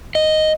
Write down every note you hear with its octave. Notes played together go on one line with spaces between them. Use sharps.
D#5